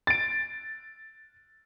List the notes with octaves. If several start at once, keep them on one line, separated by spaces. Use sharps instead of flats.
A6 D7